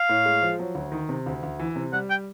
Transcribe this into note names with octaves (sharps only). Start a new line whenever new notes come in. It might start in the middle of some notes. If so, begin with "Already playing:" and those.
Already playing: F5
A2
G#3
F3
F#3
D2
D#3
C3
D2
D2
E3
C3
G3 F#5
G5